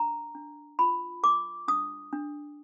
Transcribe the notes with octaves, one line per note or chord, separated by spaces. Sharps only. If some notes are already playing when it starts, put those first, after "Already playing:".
Already playing: D4 A#5
D4
F4 B5
A#4 D6
D4 D#6
D4